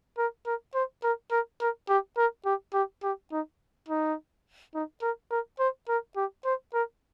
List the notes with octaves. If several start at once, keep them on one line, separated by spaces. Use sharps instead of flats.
A#4
A#4
C5
A#4
A#4
A#4
G4
A#4
G4
G4
G4
D#4
D#4
D#4
A#4
A#4
C5
A#4
G4
C5
A#4